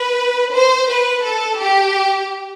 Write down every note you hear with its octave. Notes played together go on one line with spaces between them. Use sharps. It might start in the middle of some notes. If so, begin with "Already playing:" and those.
Already playing: B4
C5
B4
A4
G4